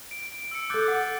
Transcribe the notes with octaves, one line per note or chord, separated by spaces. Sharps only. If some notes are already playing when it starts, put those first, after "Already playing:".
D7
E6 C#7
A4 D6 F#6 G6 A6
F#5